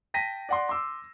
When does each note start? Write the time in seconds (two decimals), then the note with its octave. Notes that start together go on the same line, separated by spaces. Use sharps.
0.14 G5 A5 A#6 B6 D#7
0.49 D5 F#5 C6
0.69 C6 D6 E6